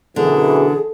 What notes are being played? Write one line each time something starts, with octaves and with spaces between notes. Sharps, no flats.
F#2 B2 D3 E3 G#4